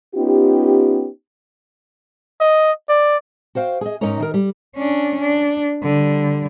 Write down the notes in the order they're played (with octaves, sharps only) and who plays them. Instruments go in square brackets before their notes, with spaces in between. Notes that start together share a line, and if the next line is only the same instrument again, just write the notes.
[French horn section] B3 C#4 D#4 F4 G4
[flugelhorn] D#5
D5
[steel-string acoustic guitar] F#4 C5 F5 G5
G#4 D#5
G#2 C#4 D#4 A#4 C#5 A#5
D#3 A#4
G3
[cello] C#4 D4
D4
D3 G3